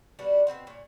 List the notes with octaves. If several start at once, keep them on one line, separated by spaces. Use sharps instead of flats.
G3 B3 D4 F#4
B2 G#3 C4 F#5
A#2 C#5